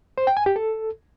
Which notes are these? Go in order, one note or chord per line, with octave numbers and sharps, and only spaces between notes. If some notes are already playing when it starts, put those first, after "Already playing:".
C5
G5
G#5
G4
A4